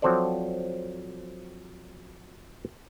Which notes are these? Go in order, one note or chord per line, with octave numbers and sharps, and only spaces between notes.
F3 F#3 C4 A4 C5 D5